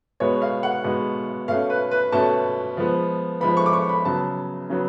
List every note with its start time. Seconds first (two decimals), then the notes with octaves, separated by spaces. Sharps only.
0.20 B2 G#3 B3 C#5
0.42 F5
0.63 F#5
0.84 B2 G#3 B3
1.48 B2 A3 C#4 F5
1.70 B4
1.91 B4
2.12 B2 A3 C#4 A5
2.77 F3 G#3 B3
3.41 F3 G#3 B3 B5
3.57 C#6
3.66 D6
3.73 C#6
3.89 B5
4.05 C#3 F#3 B3 A5
4.69 C#3 F#3 B3